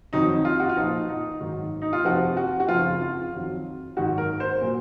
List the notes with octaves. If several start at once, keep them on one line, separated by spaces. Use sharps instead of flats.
F2 D#3 F#3 D#4
F4
F#4
F4
A#2 F3 D#4
D#4
G#2 D#3 F#3
D#4
F4
F2 C3 F3 F#4
F#4
F#4
F2 C#3 F3 F4
F4
F2 D#3 F#3
G#2 D#3 F#3 F#4
A#4
C5
A#2 F#3